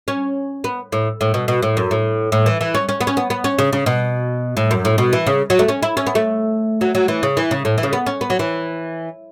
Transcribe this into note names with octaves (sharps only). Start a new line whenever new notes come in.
C#4
B3
A2
A2
B2
B2
A2
F#2
A2
A2
E3
E3
C#4
C#4
B3
C#4
B3
B3
C#4
C#3
C#3
B2
A2
F#2
A2
B2
E3
C#3
F#3
A3
C#4
E4
C#4
B3
A3
F#3
F#3
E3
C#3
E3
C#3
A2
E3
C#3
B3
C#4
B3
F#3
E3